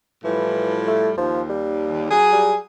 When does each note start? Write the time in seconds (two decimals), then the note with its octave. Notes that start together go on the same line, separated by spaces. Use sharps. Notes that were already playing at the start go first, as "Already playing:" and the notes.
0.24 A2 E3 F3 G3
0.87 A3
1.17 D#2 F3
1.49 G3
2.10 F#3 G#4
2.32 G3